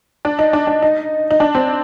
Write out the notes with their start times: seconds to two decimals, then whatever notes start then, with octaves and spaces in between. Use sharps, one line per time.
0.25 D4
0.39 D#4
0.53 D4
0.67 D4
0.82 D#4
1.31 D#4
1.40 D4
1.55 C4